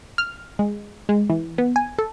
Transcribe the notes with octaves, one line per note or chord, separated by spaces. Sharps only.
F6
G#3
G#3
E3
B3
G#5
A4